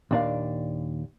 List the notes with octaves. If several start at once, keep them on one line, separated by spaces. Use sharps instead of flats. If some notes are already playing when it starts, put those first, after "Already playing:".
D#2 A#2 D4 A#4 F5